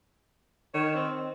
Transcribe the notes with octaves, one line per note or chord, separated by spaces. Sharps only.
D#3 C#5
C4